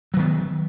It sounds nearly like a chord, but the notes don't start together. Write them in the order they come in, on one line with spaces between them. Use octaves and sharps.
F#3 D#3 B3